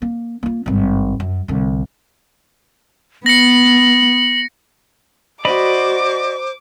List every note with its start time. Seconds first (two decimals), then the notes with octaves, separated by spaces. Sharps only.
0.02 A#3
0.43 A#3 F4
0.66 G#1 G2
1.20 F#2
1.48 C2 D3
3.26 B3 A#6 C#7 F#7
5.45 F#4 C5 D5 D#5 B5 D6